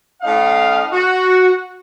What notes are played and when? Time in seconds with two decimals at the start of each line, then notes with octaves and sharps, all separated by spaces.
0.22 A2 C#4 D#5 F5
0.92 F#4